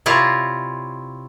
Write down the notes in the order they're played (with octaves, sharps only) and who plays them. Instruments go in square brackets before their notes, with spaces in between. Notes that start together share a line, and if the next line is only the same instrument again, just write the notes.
[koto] C3 E4 F4 C#5 D5 A#5